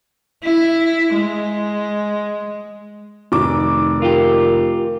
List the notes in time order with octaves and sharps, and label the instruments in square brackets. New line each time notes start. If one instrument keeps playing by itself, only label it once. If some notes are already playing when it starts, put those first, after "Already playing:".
[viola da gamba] E4
G#3
[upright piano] F1 D#3 D6
[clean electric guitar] F4 G4 [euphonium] A#4